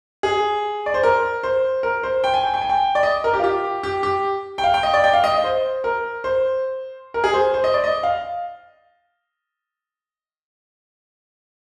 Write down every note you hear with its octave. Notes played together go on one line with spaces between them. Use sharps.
G#4
D5
C5
A#4
C5
A#4
C5
G5
G#5
G5
G5
G#5
G5
D5
D#5
A#4
G4
F4
G4
G4
G4
G5
F5
G5
D#5
D5
G5
F5
D#5
D#5
C5
A#4
C5
A#4
G#4
C5
C5
D#5
D5
D#5
F5